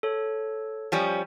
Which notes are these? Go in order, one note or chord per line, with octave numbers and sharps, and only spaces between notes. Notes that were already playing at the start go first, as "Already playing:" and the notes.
A4 C#5
F3 G3 C#4